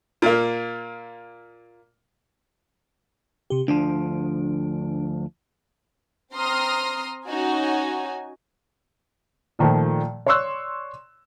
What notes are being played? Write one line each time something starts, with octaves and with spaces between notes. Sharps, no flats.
A#2 A#3
C3 G4
D2 F3 D4
C4 A#5 C6 D#6 F6
C#4 D#4 F#4 G#5
A#2 D#3 F3 A3
C#5 D5 C6 C#6 E6 F#6